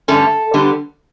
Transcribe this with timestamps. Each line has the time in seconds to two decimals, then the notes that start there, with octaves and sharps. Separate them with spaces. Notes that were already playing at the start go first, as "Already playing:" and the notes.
0.08 G2 D3 A3 C#4 A4
0.54 D3 G3 B3 D4